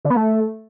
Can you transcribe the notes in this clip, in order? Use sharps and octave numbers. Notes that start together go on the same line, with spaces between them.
D3
B3
A3